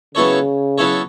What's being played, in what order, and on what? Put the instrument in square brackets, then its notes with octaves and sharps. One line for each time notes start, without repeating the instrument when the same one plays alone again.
[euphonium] C#3 [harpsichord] F#3 B3 E4 A4 C#5
[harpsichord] F#3 B3 E4 A4 C#5